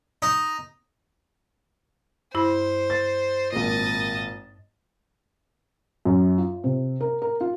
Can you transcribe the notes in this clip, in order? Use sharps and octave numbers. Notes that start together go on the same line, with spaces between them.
D#4
G2 E4 C5 B5
A6
G#1 A#2 D#5 A5
F#2
F4
C3
A#4
A#4
F4